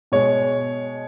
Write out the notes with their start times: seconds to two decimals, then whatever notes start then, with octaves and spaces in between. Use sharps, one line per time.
0.12 B2 G#3 C#5